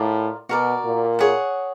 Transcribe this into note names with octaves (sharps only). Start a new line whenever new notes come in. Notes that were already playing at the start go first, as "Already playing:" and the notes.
Already playing: A2 F4 A#4 D5
B2 F#4 A#4 D5
A#2
G#4 C#5 F#5